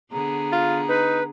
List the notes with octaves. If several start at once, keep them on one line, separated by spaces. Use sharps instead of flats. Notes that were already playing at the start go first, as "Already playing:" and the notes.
D3 B3 G#4 A#5
F4
D#4 B4